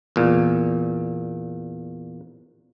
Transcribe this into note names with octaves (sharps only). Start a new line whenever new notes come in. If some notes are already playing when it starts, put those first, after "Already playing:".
E2 A#2